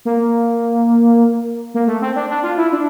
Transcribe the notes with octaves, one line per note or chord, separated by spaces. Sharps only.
A#3
A#3
A3
C4
D4
D4
F4
E4
D4